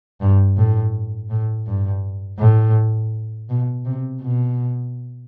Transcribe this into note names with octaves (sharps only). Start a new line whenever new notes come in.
G2
A2
A2
G2
A2
B2
C3
B2